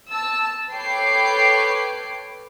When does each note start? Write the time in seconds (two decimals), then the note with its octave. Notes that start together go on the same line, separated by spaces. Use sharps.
0.10 A5 E6
0.72 A4 B4 C#5 G5 D6 C7